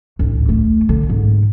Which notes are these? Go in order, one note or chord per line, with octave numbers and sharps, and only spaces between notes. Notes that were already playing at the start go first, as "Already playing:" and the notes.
A1 D2
A3
D3
G#2